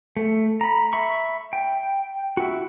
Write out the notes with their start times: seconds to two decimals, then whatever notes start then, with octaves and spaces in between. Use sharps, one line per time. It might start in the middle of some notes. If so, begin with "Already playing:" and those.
0.17 A3
0.61 A#5 B5
0.93 E5 B5 C#6
1.53 G5
2.37 E4 F#4